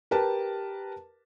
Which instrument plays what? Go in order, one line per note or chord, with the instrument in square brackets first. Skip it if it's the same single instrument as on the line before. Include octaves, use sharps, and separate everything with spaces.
[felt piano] G4 A#4 B4 A5